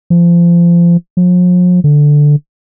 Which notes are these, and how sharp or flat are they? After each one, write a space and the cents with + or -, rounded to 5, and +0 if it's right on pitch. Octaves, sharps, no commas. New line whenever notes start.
F3 -25
F3 +45
D3 +0